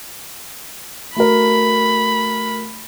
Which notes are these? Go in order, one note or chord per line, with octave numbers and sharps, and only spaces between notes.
A3 F#4 A#4 B5